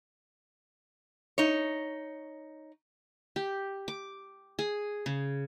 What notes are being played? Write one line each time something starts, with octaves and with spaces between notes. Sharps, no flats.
D#4 C#5
G4
D6
G#4
C#3